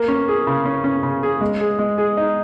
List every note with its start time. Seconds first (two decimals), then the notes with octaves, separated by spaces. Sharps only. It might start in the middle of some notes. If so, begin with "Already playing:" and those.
Already playing: A#3
0.08 C#4
0.28 G#4
0.47 C#3
0.65 C#4
0.84 C#4
1.03 C#3
1.23 G#4
1.41 G#3
1.61 G#4
1.79 G#3
1.98 G#4
2.17 D#4